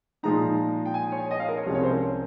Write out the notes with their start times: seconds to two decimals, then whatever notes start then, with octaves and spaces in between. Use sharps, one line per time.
0.23 A#2 F3 G#3 D#4 A#5
0.86 G5
0.94 G#5
1.12 C#5
1.31 D#5
1.39 F5
1.48 A#4
1.57 C#5
1.66 C2 C3 F3 G#3 C#4
1.75 C#5
1.84 C5
1.92 A#4